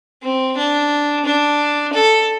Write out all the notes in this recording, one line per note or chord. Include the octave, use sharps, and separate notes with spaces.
C4
D4
D4
A4